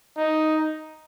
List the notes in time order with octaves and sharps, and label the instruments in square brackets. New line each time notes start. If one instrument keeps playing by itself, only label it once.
[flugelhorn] D#4